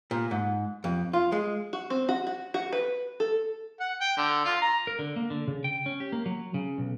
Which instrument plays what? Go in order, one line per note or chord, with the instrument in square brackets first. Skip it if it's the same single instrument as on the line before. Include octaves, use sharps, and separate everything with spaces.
[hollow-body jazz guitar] A#2
G#2
F2
F4
G#3
[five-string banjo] F#4
C4
F#4
F#4
F#4
B4
A4
[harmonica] F#5
G5
D3
F4
A#5
[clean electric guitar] A#4
D3
A#3
D3
C#3
G5
C#4
G4
A#3
F#3
C#3
B1